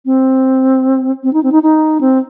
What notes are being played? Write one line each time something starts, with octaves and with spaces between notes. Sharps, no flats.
C4
C4
D#4
C4
D#4
D#4
C4